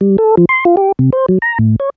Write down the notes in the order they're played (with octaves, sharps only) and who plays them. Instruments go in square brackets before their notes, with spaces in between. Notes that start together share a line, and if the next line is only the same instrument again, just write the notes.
[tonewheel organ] G3
A4
F3
C6
F4
G4
C3
C5
F#3
A#5
A2
C#5